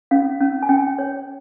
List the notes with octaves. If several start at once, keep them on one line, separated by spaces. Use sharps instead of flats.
C#4 F5
C#4
G#5
C#4 G5
C#5